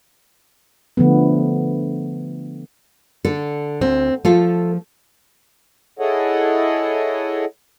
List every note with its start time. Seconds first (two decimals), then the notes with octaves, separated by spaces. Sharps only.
0.97 D3 F3 A3 B3
3.25 D3 A4
3.81 D2 C4
4.25 F3 A3 F4 A4
5.99 E4 G#4 A4 C#5 D#5 F#5